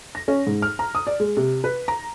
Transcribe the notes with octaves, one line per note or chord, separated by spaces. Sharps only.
A#6
C#4
G#2
F6
A#5
D#6
D5
G#3
C3
B4
A#5